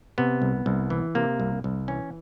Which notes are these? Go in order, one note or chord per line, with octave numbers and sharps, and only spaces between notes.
C3 B3
C2
C2
E3
C3 A#3
C2
C2
E3 C#4